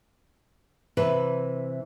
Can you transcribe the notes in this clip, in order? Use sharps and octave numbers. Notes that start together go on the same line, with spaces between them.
C3 E3 B4